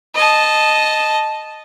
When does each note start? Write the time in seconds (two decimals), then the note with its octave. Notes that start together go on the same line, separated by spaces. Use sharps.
0.15 D#5 A5